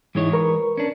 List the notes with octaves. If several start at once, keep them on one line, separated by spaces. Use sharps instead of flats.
G#2 E3 G#3 D#4 E4 C#5
A#4 B4 C#6
C#4 D4